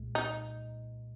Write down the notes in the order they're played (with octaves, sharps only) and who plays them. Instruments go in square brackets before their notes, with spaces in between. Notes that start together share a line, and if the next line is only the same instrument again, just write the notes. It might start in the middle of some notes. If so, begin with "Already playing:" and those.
Already playing: [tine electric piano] C2 A#2 G#3
[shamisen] D#4